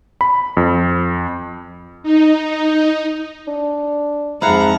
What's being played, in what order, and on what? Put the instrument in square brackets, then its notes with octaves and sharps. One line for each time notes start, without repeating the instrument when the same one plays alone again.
[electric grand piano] B5
F2
[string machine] D#4
[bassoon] D4
[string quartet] F2 A5 A#5 [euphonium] G#2 [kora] E4 F5 F#5